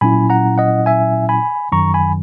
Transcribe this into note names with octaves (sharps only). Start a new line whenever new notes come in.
A#2 F#3 C#4 E4 G#5 B5
F#5 A#5
D#5 F#5
E5 G#5
G#5 B5
F#2 D#3 F#3 A#5 C#6
G#5 B5